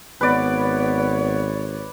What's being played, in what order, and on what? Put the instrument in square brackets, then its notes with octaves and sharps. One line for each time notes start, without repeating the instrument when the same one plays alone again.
[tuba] G#1 [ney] B3 [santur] B4 D5 [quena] C#5